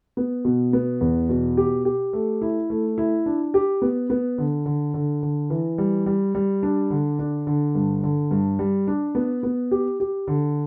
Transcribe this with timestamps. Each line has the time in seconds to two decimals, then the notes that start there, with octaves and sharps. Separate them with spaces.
0.17 B3
0.45 B2
0.73 B3
1.01 E2
1.29 B2
1.57 G4
1.85 G4
2.13 A3
2.42 E4
2.70 A3
2.98 E4
3.26 D4
3.54 G4
3.82 B3
4.10 B3
4.38 D3
4.66 D3
4.94 D3
5.23 D3
5.50 E3
5.78 G3
6.06 G3
6.35 G3
6.63 D4
6.90 D3
7.19 D4
7.47 D3
7.75 G2
8.03 D3
8.31 G2
8.59 G3
8.87 D4
9.15 B3
9.43 B3
9.71 G4
10.00 G4
10.28 D3